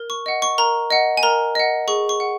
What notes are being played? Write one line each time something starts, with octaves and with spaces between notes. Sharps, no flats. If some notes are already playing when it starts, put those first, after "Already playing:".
Already playing: A#4
C#6
D#5 F#5
C#6
A#4 A#5
D#5 F#5
G#5
A#4 A#5
D#5 F#5
G#4 C#6
C#6
F#5